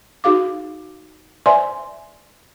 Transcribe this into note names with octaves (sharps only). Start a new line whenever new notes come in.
D#4 F#4 G#4 F5 D6
B4 C5 D5 E5 G#5 C6